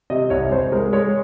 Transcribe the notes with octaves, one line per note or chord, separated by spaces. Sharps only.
C3 D#5
C2 C#5
C2 C5
G#3 A#4
G#3 C#5